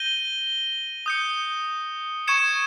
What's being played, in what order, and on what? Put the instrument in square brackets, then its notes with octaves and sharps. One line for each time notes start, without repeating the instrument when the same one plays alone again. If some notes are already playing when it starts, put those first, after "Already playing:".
Already playing: [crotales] G6 A#6 D#7 G7
D#6 G6 C#7
C#6 G#6 C#7 E7